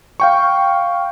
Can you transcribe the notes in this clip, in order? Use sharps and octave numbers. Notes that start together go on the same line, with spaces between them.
F5 G5 C#6